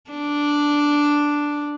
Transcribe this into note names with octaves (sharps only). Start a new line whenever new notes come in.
D4